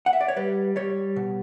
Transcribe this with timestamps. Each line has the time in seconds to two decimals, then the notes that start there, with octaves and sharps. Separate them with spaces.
0.06 F#5
0.13 E5
0.21 D5
0.28 C#5
0.36 G3 B4
0.76 G3 C#5
1.16 B2